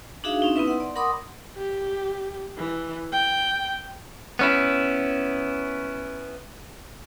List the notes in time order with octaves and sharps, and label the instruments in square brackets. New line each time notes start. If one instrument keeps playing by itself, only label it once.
[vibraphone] D4 D#4 F#4 G#4 E5 F5
C4 C#4 D#4
B3 D#4 E4 B4 E5
F#5 C6
D5
A#4 F#5 B5 C6 D6 D#6
[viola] G4
E3
G5
[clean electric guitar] B3 C#4 E4